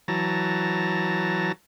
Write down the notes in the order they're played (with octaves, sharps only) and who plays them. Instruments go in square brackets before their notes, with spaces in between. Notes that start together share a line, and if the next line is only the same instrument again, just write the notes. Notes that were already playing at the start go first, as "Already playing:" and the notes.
[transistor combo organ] E3 F#3 A5 A#5